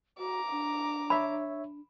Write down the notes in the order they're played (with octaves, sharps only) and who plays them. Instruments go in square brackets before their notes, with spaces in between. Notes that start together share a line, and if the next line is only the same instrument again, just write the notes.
[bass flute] F#4 [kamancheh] A#5 D6
[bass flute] D4
[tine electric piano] C#5 E5 [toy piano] B5